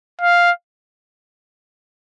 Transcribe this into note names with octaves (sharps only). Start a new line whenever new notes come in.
F5